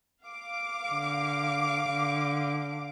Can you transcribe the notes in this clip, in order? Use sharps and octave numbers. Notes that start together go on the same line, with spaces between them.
F5 D6
D3
D3